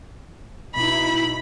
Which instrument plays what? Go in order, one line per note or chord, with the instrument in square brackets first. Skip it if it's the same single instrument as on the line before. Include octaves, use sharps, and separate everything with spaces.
[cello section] B2 D#4 E4 [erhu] B5